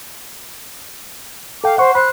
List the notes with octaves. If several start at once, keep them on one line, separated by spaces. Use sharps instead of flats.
A4 F5 G5 D6
C5 F#5 C#6
C5 B5 F#6